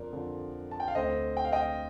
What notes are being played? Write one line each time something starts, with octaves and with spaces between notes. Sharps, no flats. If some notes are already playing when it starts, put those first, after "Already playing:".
Already playing: F2 D3 F3 A#4 D5
F2 D3 F3
A5
G5
F5
D2 D3 A3 C4 C5 D#5
G5
F5
D#5 G5